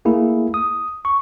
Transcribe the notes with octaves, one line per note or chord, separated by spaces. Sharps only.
A3 A#3 E4 G#4
D#6
C#6